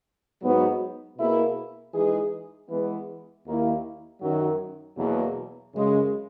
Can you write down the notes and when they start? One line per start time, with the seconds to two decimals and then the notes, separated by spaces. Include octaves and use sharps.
0.41 G#2 F#3 B3 D#4 F#4
1.17 B2 A#3 E4 G#4
1.92 E3 G#3 D#4 G#4
2.69 E3 G#3 B3
3.45 D#2 D#3 A#3 E4
4.20 F#2 D#3 F#3
4.96 E2 B2 F#3 A#3
5.72 F#2 C#3 G#3